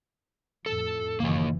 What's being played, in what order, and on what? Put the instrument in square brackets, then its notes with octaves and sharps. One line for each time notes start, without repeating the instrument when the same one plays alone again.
[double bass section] F2 A2 [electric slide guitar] A4
[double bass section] F#1 E3 [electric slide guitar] D#3 A#3